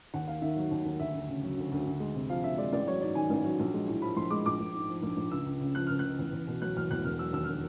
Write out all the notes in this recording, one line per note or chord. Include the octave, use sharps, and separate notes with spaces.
D#2 F#5
D#2 F5
D#3 E5
F#3
D#2
D#2
D2 E5
D2
C#3
F#3
D2
D2
D2
G#3
C3
F3 F5
D2 E5
G#3 D5
A1 D5
F#3 C#5
G#2 D5
D#3 G#5
A1
F#3
A#1
G#3
A2
F3 B5
A#1 C6
G#3 D6
A#1 D6
A#1
G#2
F3
A#1
A#1
C#2 E6
C#2
C#3
F3 F#6
C#2 F6
C#2 F#6
E2
E2
B2
F#3 F#6
E2 F6
E2 F#6
E1 F6
F#3 E6
D#2 E6
D3 F6